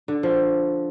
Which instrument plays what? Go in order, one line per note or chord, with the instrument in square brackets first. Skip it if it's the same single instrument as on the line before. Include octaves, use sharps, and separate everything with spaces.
[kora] D3
F3